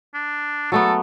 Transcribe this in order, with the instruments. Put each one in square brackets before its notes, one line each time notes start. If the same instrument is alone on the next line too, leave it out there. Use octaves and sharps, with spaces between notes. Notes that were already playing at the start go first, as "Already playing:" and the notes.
[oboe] D4
[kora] F#3 A3 B3 [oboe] A4